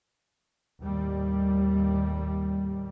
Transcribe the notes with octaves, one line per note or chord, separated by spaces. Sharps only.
D#2 A2 G3